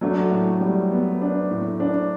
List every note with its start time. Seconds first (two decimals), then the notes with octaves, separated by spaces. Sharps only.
0.01 F#3 A3 D4
0.31 A2
0.61 G3
0.91 B3
1.21 D4
1.50 A2
1.80 D4